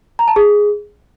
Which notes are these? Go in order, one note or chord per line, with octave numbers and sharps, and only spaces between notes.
A#5
A5
G#4